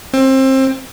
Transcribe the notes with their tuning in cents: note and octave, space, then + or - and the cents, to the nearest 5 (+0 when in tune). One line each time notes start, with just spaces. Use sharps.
C4 +25